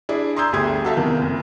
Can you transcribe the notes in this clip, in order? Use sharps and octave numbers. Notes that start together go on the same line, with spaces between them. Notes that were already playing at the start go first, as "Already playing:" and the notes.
D4 E4 G#4
A#5 C6 D#6 E6 G6 G#6
G1 D2 G3 G4 G#4 G#6
F#4 A4 E5 F5
E2 C3 D#3
F#1 F2